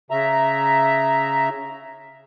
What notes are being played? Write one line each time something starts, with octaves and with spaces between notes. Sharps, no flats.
C#3 E5 A#5